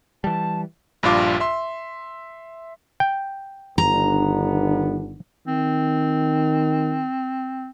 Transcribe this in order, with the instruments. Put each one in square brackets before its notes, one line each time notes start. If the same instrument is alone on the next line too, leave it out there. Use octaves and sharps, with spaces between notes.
[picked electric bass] E3 G3 [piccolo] A5
[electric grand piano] A#1 G2 D4 F4 D6
E5 C6
[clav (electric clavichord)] G5
[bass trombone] G1 [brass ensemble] D#3 B3 D4 [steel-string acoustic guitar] A#5
[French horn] D#3 [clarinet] C4